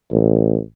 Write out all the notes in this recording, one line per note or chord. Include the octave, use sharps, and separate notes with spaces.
A1